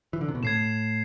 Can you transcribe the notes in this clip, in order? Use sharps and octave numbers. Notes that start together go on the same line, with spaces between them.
E3
D3
C3
B2
A2 G#6 C7 E7